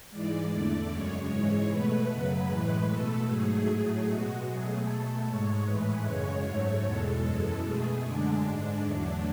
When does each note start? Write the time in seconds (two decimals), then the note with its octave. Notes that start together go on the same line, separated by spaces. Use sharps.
0.10 G#2 E3 G#3 D5
0.49 E2 D3 A3
0.90 F#2 C#3 G#3 C#5
1.29 G#2 E3 G#3 C#5
1.68 B2 A3 B4
2.09 F#2 C#3 F#3
2.48 A2 E3 G#3
2.88 B2 A3 A4
3.27 G#2 F#3 A3 G#4
3.67 A2 F#3 A3
4.06 B2 G#3 F#4
4.46 B2 F#3 A3 G#4
4.85 B2 A3 A4
5.25 G#2 G#3 C#5
5.65 A2 E3 G#3 B4
6.05 F#2 C#3 G#3 C#5
6.44 G#2 F#3 A3 C#5
6.84 E2 B2 G#3 A4
7.23 F#2 E3 G#3 A4
7.63 B2 A3 G#4
8.03 F#2 D3 G#3 D4
8.43 G#2 G#3
8.83 E2 D3 F#3 A3